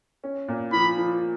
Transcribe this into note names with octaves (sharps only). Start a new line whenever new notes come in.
C#4
A#2
F3 B5
F3